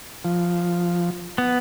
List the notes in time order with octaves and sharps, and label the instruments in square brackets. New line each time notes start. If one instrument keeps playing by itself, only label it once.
[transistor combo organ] F3
[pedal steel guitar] B3